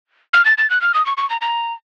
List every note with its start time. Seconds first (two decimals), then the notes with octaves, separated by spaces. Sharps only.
0.33 F6
0.45 A6
0.58 A6
0.70 F#6
0.81 F6
0.94 D#6
1.06 C#6
1.17 C#6
1.30 A#5
1.41 A#5